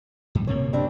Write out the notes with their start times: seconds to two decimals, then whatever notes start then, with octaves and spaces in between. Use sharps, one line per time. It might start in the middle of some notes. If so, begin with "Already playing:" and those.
0.35 F#2
0.47 D1 C3 A#3 C#5
0.73 G3 C4 D4